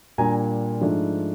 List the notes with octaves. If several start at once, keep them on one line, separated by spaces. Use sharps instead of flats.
A#2 G3 A#3 D4 G#5 A#5
G#2 F3 A3 D4